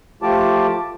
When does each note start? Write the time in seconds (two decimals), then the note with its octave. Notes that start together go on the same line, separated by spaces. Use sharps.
0.22 F3 A3 F4 G4 A5 D6